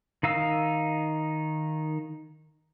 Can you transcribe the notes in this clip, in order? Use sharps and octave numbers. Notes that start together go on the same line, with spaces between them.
D#3 D#4 F5 E6